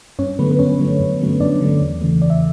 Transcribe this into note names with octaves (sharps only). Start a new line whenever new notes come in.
G2 C#4 C#5
D3 F#3 A3 B3 B4
B4
G2 C#4 C#5
D3 F#3 A3
G2
D3 F#3 A3
G2 D4 D5
D3 F#3 A3
E2
C#3 E3 A3
E2 D5
E5